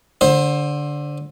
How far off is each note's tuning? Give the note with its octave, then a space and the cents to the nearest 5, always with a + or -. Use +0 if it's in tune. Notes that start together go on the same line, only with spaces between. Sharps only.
D3 -5 C5 +20